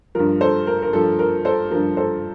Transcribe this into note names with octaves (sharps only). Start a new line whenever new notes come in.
G2 F3 A#4
A4 C5
A#4
A#4
G2 F3 A4
A#4
A4 C5
G2 F3 A#4
A4 C5